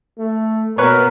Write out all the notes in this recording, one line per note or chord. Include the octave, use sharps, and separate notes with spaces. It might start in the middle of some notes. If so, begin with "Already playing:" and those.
A3
B2 A#3 B3 A#4 B4 C#5